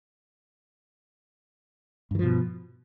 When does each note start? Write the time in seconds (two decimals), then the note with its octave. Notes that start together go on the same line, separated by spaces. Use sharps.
2.11 G2
2.15 E3
2.19 F3
2.23 B2